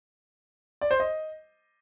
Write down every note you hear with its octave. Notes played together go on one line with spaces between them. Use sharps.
D5
C5
D#5